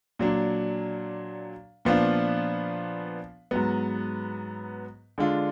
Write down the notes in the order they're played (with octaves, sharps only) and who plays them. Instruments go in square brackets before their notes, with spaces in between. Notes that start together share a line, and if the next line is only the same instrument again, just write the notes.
[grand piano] A#2 F#3 D4
A#2 F3 B3 D4 F4
G#2 F#3 B3
D3 G#3 D4 F4